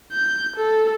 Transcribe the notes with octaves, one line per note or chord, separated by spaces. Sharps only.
G6
A4